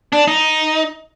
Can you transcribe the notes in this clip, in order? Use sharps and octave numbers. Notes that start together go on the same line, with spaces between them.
D4
D#4